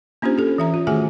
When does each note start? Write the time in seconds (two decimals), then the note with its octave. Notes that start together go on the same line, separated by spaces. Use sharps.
0.22 A#3 C#4 D4 F4 G4 C5
0.38 G4 A4
0.58 E3 E5 A#5
0.74 F4
0.87 D#3 A3 F#4 G#4 E5 G#5